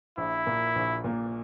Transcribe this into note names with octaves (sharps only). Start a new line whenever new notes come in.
A#1 E4
A#2 A#3
A#1
A#2 A#3